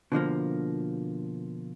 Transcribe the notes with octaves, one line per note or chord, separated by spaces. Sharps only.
B2 D3 F3 A#3